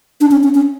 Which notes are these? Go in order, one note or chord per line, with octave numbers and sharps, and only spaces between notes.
D4
C#4
C#4
C#4